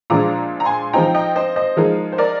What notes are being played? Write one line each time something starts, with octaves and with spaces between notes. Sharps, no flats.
A#2 F3 G#3 D4 A#5 D6
A#5
G#5 C6
F3 C4 D#4 G5 A#5
D#5 G5
C5 D#5
C5 D#5
F3 G#3 D#4 A#4
C5
A#4 D5